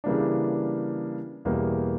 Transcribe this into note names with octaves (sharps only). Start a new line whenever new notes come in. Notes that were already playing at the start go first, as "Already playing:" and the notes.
C#3 E3 G3 A#3 D4
E2 B2 G3 A#3